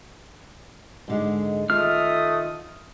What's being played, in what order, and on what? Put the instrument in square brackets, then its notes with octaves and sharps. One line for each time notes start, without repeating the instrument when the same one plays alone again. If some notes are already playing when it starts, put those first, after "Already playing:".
[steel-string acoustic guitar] G#2 D3 G#3
[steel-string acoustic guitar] D#3 F4 [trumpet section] A3 D#6 [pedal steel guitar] F6